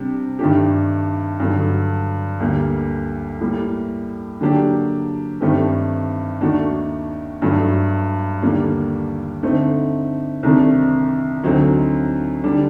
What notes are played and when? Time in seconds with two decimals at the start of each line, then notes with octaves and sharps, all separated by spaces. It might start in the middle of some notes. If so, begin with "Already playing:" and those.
Already playing: C3 G3 D4
0.39 G2 D#3 A3 D4 G4
1.40 G2 D3 F#3
2.40 D2 D3 G3 A#3
3.40 A2 G3 A#3
4.41 D3 F#3 A#3 D4 G4
5.41 G2 D#3 A3 C4 G4
6.41 D#2 D#3 A3 D4 F#4
7.42 G2 F#3 A3
8.42 D#2 D3 G3 A#3 D4
9.43 D3 A3 C4 D#4
10.43 C2 C3 D#3 A3 D4
11.43 D2 D3 F#3 C4 D#4
12.44 D3 G3 D4